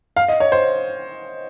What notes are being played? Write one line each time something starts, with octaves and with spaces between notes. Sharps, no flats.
F5
D#5
C#5
C5